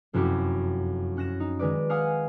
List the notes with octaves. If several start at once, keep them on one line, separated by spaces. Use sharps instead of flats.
F1 F#2 E4 F#4 G4
C#4 F#6 A#6 E7
D#4
D#3 G#3 B4 D5
F5 F#5 G#5 D#6